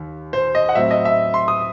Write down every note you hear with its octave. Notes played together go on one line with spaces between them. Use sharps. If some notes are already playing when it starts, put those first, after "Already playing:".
Already playing: D#2 D#3
C5
D#5
F#5
A2 F#3 C4 E5
D#5
E5
C6
D#6